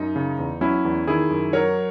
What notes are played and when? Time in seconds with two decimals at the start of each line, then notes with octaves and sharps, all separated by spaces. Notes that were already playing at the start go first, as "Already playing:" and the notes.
Already playing: F#2 D#4
0.16 C#3
0.39 E2
0.61 F#3 C#4 E4
0.85 E2
1.07 D#3 E4 G#4
1.30 F#2
1.53 F#3 A#4 C#5